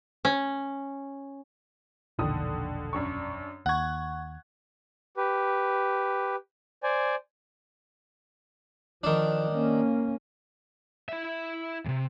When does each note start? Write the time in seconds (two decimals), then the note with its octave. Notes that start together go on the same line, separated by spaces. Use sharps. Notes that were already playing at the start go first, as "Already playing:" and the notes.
0.25 C#4
2.19 E1 A#1 D3 D#3 D#6
2.93 F#2 D4 C#6
3.66 D#2 F#5 C#6 F#6 G#6
5.17 G4 B4
6.83 C5 D5 G#5
9.04 D#3 F3 D4
9.51 A#3 C#4
11.09 E4 E5
11.85 D#2 C3